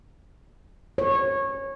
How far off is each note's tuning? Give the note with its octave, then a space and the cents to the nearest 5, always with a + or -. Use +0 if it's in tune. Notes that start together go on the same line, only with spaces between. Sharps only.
C#5 -20